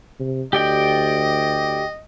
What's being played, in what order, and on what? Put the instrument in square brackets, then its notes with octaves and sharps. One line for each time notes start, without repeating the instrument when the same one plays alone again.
[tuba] C3
[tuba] D2 [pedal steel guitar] G4 D5 G5 [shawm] D#5